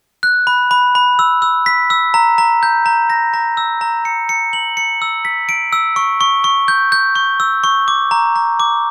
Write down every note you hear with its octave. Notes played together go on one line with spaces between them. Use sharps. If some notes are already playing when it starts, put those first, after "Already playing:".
F#6
B5
B5
B5
E6
E6
B6
E6
A#5
A#5
G6
A#5
A#6
A#5
E6
A#5
C#7
C#7
F#7
C#7
E6
B6
D7
E6
C#6
C#6
C#6
G6
G6
C#6
E6
C#6
D6
A#5
A#5
D6